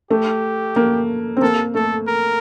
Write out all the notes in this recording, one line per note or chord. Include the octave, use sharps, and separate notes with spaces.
A3 G4
A#3
C4
A#3 A4
A3 A4
A#4